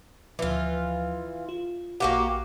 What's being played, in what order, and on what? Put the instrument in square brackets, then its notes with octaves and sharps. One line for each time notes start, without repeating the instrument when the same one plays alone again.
[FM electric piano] D2 F3 [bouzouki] E3 F4
[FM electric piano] F4
[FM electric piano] A#1 F5 F#5 [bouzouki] A#3 F#4 G4